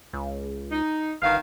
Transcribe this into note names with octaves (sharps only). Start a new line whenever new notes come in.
C#2
D#4
G1 D#3 B3 F5